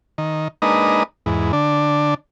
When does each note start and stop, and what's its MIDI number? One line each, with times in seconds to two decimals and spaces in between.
0.18 0.48 51
0.62 1.03 56
0.62 1.03 58
0.62 1.03 62
0.62 1.03 63
0.62 1.03 71
0.62 1.03 75
1.26 1.52 40
1.26 1.52 44
1.53 2.14 50
1.53 2.14 62